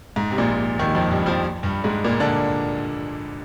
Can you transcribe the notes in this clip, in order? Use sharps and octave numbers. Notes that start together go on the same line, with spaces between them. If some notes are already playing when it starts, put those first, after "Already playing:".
G#2
C3
A#1 A#2
D#2 D#3
F2 F3
G2 G3
F2 F3
G2 G3
G#2 G#3
A#2 A#3
D3 D4